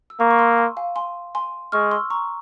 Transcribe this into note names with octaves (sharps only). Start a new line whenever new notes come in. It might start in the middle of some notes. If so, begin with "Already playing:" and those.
E6
A#3 A#5 C#6
C#6
C6 E6
G#5 C6
F5 G#5
G#5 C6
G#5 C6
G#3 C#6 F6
C6 E6
A#5 C#6